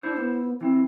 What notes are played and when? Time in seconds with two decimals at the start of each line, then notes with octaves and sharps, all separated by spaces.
0.03 D4 E4 C5
0.17 B3
0.61 E3 C4 E4